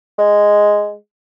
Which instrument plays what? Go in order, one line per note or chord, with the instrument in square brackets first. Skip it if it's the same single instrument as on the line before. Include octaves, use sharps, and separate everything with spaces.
[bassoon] G#3